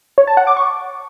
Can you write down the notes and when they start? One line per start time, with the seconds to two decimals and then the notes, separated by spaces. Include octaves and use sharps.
0.18 C#5
0.27 A5
0.37 F#5
0.47 D6
0.57 C#6